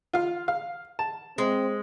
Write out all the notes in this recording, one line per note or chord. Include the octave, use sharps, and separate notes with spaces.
F4 F5
F5
A5
G#3 C4